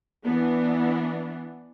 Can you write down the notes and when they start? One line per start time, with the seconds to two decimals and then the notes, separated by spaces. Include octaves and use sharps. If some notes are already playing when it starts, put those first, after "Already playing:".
0.25 E3 B3 D4